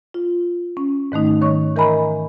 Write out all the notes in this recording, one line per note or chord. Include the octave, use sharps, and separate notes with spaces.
F4
C#4
G#2 D#3 A3 D#4
D#3 G3 C#5 C#6
E3 A#4 D#5 G#5 A#5 B5